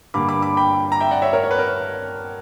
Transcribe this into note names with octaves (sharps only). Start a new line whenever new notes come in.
G2 D3 A#3 B5 D6
B5 D6
B5 D6
G5 B5
A#5
E5 G5
D5 F#5
C#5 E5
A#4 C#5
C#5
B4
A#4